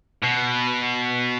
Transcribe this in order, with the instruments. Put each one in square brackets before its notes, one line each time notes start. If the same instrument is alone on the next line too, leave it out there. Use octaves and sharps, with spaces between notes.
[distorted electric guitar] B2